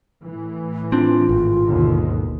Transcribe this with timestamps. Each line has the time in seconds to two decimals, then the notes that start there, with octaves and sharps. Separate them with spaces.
0.24 A2 E3
0.92 C4 D4 F4
1.29 G#1
1.66 D#2 B2 D3